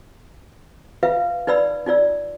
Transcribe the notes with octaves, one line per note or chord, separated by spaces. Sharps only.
F4 B4 E5 F5
D#4 B4 D5 B5 E6
D#4 F4 D5 E6